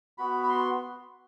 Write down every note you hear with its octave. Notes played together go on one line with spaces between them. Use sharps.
B3 F#4 B5
B5
C6